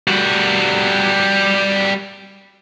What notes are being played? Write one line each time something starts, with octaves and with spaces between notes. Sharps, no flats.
G3 F#4